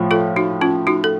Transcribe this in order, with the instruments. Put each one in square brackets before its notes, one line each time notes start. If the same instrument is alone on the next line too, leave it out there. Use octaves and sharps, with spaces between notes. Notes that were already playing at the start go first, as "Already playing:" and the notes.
Already playing: [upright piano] A2 F3
[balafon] F4 A4
D#4 F#4
C#4 F4
D#4 F#4
A4